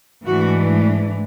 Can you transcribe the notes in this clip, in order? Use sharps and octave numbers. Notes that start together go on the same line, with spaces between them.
G#2 E3 A3 D4 F#4